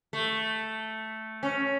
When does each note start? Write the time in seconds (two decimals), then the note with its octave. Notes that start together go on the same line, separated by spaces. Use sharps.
0.13 A3
1.43 C#4